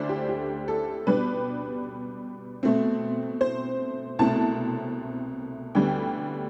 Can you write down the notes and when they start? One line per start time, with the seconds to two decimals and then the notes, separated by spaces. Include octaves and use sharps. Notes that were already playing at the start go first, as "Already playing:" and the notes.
Already playing: D2 D3 A3 D4 C5 D5
0.09 G4
0.29 G4
0.68 A4
1.07 B2 G3 B3 D4 B4
2.63 B2 A3 C4
3.41 C5
4.19 C2 B2 A3 C4 A5
5.75 D2 D3 G3 B3 G5